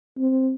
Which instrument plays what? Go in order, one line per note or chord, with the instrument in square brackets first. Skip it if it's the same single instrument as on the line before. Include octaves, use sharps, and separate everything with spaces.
[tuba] C4